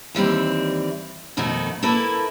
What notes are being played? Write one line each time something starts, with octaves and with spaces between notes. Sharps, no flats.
D#2 E3 G3 C4
F2 B2 D#3 A3 D#4 F#4
A#3 E4 A4 B4